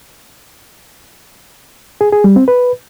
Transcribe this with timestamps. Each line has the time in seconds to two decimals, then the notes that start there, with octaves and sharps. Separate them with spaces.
2.01 G#4
2.12 G#4
2.24 G3
2.36 C4
2.48 B4